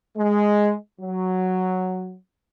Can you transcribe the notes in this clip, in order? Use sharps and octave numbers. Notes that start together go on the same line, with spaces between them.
G#3
F#3